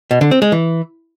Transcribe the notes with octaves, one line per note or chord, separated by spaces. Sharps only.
B2
D3
C4
G#3
E3